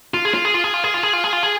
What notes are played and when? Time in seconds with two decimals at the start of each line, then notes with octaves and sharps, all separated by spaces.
0.14 F4
0.25 G#4
0.34 F4
0.45 G#4
0.54 F4
0.64 G#4
0.74 F4
0.84 G#4
0.94 F4
1.03 G#4
1.13 F4
1.24 G#4
1.33 F4
1.43 G#4